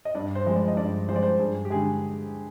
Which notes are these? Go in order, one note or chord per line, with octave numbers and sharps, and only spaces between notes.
D#5
G2 D5
C5
F3 G#3
D5
D#5
G2 D5
F3 G#3 C5
D5
C5
G2 G#4
G4
D3 G#3 G#4